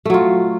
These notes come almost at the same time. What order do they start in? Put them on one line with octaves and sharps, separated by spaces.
A3 F#3 F4